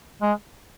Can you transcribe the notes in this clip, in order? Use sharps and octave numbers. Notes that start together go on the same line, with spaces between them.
G#3